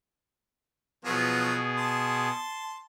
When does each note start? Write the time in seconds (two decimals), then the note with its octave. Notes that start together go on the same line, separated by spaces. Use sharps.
1.05 B2 F3 F#3 B3 G#4
1.77 A5 C6